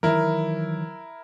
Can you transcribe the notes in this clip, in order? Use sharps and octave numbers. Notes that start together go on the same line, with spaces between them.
D#3 E3 F#3 E4 A#4